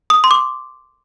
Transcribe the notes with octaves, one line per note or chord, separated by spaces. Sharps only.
D#6
C6
D6